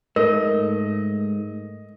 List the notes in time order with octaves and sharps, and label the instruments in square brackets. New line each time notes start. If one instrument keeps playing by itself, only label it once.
[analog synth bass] G#2 [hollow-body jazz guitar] A3 [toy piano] A#4 [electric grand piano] D#5